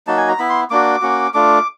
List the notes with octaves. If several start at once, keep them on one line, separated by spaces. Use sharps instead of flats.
F#3 A#3 D#4 F#4 A5
G#5
A#5
B3 E4 B5
C6
A#3 D4 F#4 D6
A#3 C#4 F#4
A3 D4 F4 D6